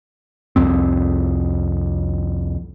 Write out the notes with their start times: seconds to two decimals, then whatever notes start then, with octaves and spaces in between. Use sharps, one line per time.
0.56 C2 F2 C4